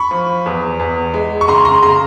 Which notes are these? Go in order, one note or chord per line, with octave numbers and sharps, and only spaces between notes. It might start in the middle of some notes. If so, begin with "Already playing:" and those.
Already playing: B5 C#6
F3
E2
E2
G#3
C#6
C#3 A#5 C6
A#5 C6
C#3 A#5 C6